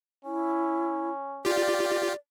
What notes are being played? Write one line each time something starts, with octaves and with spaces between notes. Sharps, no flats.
C#4 E4
F4 G4 D5